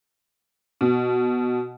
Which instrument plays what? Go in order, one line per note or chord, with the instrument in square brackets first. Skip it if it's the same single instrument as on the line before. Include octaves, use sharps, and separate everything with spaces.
[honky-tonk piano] B2